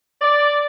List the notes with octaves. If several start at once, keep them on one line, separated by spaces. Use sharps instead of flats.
D5